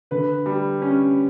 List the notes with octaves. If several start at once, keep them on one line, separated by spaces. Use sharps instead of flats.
D3 B4
G3
C#4